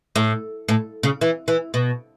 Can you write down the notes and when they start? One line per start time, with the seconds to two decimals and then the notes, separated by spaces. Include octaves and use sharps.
0.16 A2
0.68 A2
1.03 C#3
1.21 E3
1.48 E3
1.74 B2